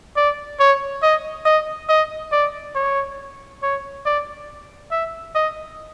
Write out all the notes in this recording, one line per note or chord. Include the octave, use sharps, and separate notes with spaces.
D5
C#5
D#5
D#5
D#5
D5
C#5
C#5
D5
E5
D#5